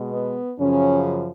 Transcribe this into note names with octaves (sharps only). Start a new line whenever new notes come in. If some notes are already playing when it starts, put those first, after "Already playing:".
Already playing: B2 G#3
B3
F#2 C#3 F3 C#4